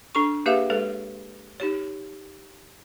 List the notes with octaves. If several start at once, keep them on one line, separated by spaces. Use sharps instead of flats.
D4 A4 C#6
A#3 G4 G#4 B4 E5 F5
G#3 A4 B4 C#5
D#4 G4 C#5